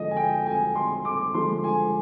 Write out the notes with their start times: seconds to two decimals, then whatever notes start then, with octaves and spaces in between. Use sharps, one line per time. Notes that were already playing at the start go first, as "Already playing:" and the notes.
Already playing: D3 F3 G#3 D#5
0.11 G#5
0.17 G5
0.46 G#5
0.75 C6
1.05 D6
1.34 D3 F3 G#3 C6
1.64 G#5